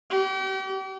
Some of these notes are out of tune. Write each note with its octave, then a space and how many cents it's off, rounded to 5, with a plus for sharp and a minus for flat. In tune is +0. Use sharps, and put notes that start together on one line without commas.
G4 -40